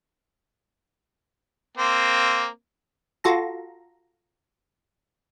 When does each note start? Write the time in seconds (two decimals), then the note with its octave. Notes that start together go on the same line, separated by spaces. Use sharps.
1.78 A#3 C4
3.24 F4 F#4 A4 A#5